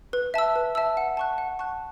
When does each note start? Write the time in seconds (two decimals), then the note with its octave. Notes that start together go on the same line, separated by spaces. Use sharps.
0.13 B4
0.34 E5 A5 E6
0.55 B4
0.75 E5 A5 E6
0.97 F#5
1.17 A5 C#6 F#6
1.38 F#5
1.59 A5 C#6 F#6